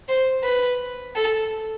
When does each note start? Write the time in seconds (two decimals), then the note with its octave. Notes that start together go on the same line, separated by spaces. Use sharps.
0.08 C5
0.44 B4
1.15 A4